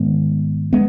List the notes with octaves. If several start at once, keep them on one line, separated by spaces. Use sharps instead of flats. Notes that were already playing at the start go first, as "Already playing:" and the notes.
Already playing: G#2 D#3 G#3 B3
G#3 B3